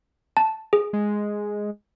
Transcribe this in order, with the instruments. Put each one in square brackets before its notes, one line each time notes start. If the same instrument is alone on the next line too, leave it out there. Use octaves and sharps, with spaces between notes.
[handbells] A5
G#4
[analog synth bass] G#3